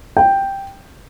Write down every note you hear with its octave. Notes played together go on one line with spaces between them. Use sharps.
G5